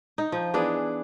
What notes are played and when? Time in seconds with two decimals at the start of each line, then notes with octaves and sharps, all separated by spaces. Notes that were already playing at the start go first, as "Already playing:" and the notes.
0.18 D#4
0.32 F3
0.54 E3 B3 D4 G#4